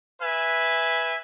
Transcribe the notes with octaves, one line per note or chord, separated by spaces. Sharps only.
B4 E5 G#5